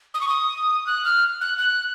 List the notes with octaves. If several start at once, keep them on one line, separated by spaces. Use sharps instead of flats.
D#6
C#6
D#6
F#6
F6
F#6
F#6